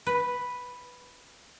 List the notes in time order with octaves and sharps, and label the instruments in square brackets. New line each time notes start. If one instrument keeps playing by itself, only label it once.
[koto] B4